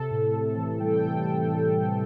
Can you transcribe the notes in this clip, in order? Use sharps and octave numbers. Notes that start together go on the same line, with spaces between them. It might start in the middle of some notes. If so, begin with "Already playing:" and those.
Already playing: C3 A4
A2
A2
E3
G3 G5
G5
A2